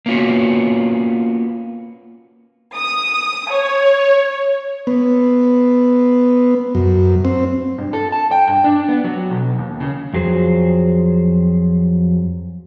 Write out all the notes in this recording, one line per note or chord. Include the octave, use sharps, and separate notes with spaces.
A#3 B3 C#4 F4 F#4
D#6
C#5
B3
F#2
C4
G2
A4
A5
G5
G2
D4
B3
F#3
B1
D#2
C#3
F2 F#3 G#4 C5